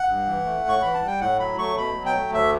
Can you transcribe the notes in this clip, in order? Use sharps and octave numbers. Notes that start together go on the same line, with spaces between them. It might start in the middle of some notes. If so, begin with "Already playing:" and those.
Already playing: F#5
G2
E3
A3
A2 C#6
E3 B5
A5
G3 G5
A2 F#5
F#3 B5
A3 C#6
B2 B5
F#3
G5
A3
D2 E5